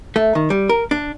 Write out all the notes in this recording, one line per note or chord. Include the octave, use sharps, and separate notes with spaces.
A3
D#3
G3
A#4
D4